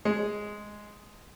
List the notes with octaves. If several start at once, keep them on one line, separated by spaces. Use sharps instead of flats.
G#3